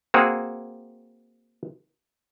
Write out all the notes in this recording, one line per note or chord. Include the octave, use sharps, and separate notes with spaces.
A#3 C4 F#4 G#4